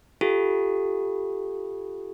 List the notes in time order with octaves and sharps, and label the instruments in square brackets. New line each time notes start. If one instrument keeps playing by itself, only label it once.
[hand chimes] F4 G4 A4